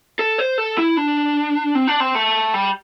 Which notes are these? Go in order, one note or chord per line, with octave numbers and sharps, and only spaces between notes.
A4
C5
A4
E4
D4
C4
D4
C4
A3
G3